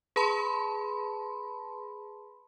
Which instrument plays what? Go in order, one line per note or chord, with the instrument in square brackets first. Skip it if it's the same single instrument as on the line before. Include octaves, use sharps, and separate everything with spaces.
[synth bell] G#4 B4 A5 B5 C6